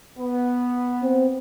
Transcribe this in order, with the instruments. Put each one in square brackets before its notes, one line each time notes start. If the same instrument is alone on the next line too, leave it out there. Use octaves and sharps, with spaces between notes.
[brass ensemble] B3
[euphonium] C4